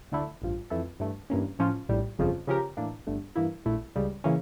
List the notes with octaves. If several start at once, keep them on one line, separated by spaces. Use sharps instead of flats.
D2 D3 A3 E4
A1 G2 F3
F2 E3 A3 E4 A4
G2 E3 A3
G2 E3 A#3 C#4
A2 F3 C#4 F4
A#1 A2 G3
G1 F2 C#3 F3
C#3 F3 C#4 G4 A#4
A2 E3 A#3 D4
G1 G2 D3 A3
G2 E3 A#3 E4
A#1 A#2 A3 E4
C#2 C#3 G3
C#3 E3 A#3 C#4